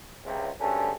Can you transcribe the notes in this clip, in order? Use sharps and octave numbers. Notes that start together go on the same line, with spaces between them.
C#2 C3
D2 G2 C#4 G#4 A4